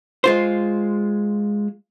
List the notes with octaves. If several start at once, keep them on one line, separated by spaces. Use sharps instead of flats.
G#3 F4 C5